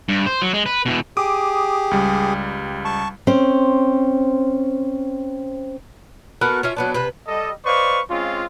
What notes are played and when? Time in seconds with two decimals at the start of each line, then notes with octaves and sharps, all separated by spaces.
0.09 G2
0.26 C5
0.42 F#3
0.54 G#3
0.66 B4
0.86 B2 E3
1.17 G4 G#4 D6 D#6
1.91 C#2 G3
2.85 A5 C#6
3.27 C4 C#4 C5
6.41 A3 B3 F#4 A#4
6.63 C#4 F4 E5
6.77 F#3 B3 D4
6.94 C3 B4
7.27 G3 A4 D#5
7.65 B4 C5 D5 D#5 F5 C#6
8.09 G#3 C4 C#4 F4